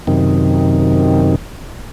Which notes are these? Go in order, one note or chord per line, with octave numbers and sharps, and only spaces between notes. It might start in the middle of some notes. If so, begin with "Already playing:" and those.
F#2 C3 D#3